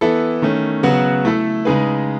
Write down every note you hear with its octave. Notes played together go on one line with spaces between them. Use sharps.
E3 B3 E4 A4
D#3 A3 C#4
C#3 F#3 B3 F#4
A3 E4 A4
C#3 G#3 D#4 G#4 B4